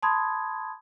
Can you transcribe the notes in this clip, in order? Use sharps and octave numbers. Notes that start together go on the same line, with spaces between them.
A5 B5 C6 D#6 G#6